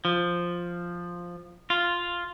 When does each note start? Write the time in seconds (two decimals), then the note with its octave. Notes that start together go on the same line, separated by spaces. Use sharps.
0.05 F3
1.70 F4